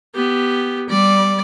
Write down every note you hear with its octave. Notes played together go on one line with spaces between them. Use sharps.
B3 G4
G3 D5